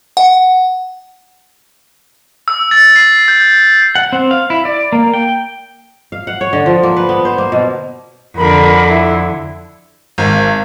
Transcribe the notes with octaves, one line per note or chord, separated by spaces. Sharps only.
F#5
E6
A6
C7
G6
F#5
C4
F5
E4
D5
A#3
G5
F5
F#5
C#5
D3
F3
A#3
B4
B3
C5
A#3
B2
F2 D3 A#4 B5
E4
G#1